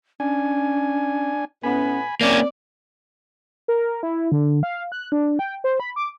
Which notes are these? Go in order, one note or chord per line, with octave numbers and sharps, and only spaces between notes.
C#4 D4 G#5
A2 B3 C#4 G#5 B5
A#3 C4 C#4 D5
A#4
E4
D3
F5
F#6
D4
G5
C5
B5
D6